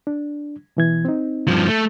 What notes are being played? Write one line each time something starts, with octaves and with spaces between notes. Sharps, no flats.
D4
B2 E3 G#6
C4 D#4
G2 F3
A3